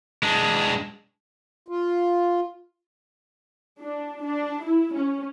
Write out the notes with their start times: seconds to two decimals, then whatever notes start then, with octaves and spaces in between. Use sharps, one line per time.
0.23 G#3 D4
1.68 F4
3.80 D4
4.24 D4
4.63 E4
4.95 C#4